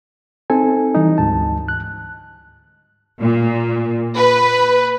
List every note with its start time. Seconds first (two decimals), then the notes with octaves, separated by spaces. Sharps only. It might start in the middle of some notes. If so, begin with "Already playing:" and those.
0.50 C4 D#4 A4 G#5
0.95 E3 G3 D#4
1.18 D2 G#2 A5
1.68 F#6
3.21 A#2
4.17 B4